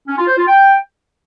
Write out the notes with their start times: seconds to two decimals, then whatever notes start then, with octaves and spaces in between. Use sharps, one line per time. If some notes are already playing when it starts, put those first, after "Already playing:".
0.08 C#4
0.18 F4
0.27 C5
0.37 F4
0.47 G5